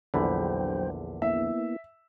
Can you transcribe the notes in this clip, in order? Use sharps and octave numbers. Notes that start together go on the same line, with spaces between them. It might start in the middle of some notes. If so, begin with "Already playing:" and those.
A#1 E2 D3 F#3 C5 G5 B5
A#3 B3 E4 E5